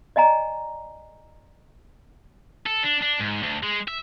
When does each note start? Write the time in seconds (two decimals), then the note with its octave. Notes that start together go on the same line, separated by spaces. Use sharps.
0.16 D5 D#5 G#5 A#5
2.66 A4
2.84 D4
3.02 D4
3.21 G#2
3.43 D2
3.63 G#3
3.88 E5